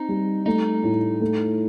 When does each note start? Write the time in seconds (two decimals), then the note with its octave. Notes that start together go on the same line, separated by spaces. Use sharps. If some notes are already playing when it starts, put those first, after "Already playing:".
Already playing: C4 D#4
0.09 G3
0.46 A3 D#4
0.83 A2
1.21 A3